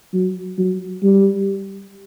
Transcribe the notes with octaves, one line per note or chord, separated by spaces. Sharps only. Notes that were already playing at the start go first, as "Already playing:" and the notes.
F#3
F#3
G3